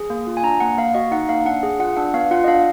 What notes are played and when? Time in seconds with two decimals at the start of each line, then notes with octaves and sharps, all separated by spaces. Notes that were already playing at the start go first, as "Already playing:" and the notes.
Already playing: G#4
0.10 A#3
0.27 F4
0.37 G#5
0.43 D4 A#5
0.60 A#3 F#5
0.77 A#3 F5
0.94 F#4 D#5
1.11 D#4 F#5
1.29 A#3 F5
1.46 D4 F#5
1.63 G#4
1.79 F4 F#5
1.97 D4 F#5
2.14 B3 F5
2.31 F4 F#5
2.44 D#5
2.47 D4 F5